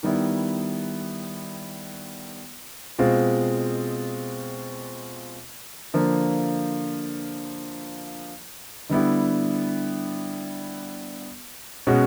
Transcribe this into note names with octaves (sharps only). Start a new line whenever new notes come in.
D#3 G3 B3 E4
B2 G#3 C4 F4
D3 F3 A#3
D3 G3 B3 E4 G4
B2 G#3 C#4 F#4